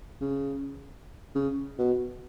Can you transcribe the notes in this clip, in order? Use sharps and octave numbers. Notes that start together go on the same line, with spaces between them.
C#3
C#3
B2